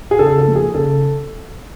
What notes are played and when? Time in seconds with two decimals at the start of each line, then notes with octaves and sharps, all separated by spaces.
0.11 G#4
0.19 C#3 A4
0.38 A4
0.47 F3 A#3
0.55 G#4
0.74 C#3 A4